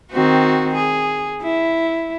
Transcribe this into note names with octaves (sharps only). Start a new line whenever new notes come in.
D#3 C4 F#4
G#4
E4